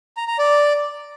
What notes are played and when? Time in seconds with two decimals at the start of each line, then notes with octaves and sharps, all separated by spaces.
0.17 A#5
0.28 A#5
0.39 D5